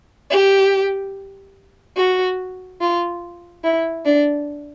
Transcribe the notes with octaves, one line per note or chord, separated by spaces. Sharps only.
G4
F#4
F4
E4
D4